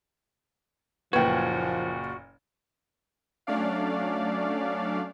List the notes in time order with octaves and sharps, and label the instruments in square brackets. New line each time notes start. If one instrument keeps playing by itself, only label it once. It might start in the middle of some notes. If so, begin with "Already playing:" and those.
[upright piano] F#1 A#2 G#6 [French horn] F3 [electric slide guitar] F#4 [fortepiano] B4 G5
[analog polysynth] F#3 A3 C#4 D4 D5 F5